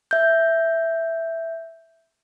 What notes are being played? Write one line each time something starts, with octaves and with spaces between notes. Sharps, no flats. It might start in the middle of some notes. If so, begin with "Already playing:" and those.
E5 G6